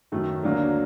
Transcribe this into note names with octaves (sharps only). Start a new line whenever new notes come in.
F#2 D#3 F#3 A3
D2 D3 F#3 A#3 D4